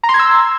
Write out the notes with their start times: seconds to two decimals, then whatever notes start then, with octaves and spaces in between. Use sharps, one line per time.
0.03 A#5
0.09 C6
0.14 G#6
0.19 E6